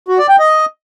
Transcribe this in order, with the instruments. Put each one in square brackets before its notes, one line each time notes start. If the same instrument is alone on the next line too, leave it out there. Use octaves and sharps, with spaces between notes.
[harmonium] F#4
D5
G5
D#5